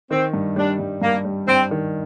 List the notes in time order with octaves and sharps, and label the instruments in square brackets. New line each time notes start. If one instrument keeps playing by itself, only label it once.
[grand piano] D#3 [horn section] C4
[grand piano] G2
[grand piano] G3 [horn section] D4
[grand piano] G2
[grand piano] G2 [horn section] A#3
[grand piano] G3
[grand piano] G2 [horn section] C4
[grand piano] D#3